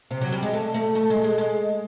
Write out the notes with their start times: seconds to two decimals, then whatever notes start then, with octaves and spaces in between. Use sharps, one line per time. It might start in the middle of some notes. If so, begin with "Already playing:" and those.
0.11 C3
0.21 F#3
0.32 G3
0.43 G#3
0.53 A3
0.74 A3
0.95 A3
1.10 G#3
1.24 G#3
1.38 G#3